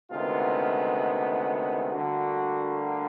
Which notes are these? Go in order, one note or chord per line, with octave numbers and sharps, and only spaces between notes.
D2 C3 D#3 G#3 B3 F4
D2 D3 G3 A#3 F#4